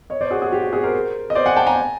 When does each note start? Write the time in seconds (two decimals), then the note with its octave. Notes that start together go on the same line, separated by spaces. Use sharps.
0.10 C#5 D#5
0.21 C5 D5
0.31 F#4 G#4
0.42 F#4 G#4
0.52 G4
0.62 F#4
0.72 F#4 G#4
0.83 A#4 C5
1.30 D#5
1.35 C5 D5
1.46 F#5 G#5
1.56 G5 A5
1.67 G#5 A#5